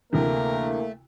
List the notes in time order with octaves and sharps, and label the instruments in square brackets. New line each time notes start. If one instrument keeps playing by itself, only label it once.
[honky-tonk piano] D2 C3 E3 [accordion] A3 [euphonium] A#3 [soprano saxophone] A#4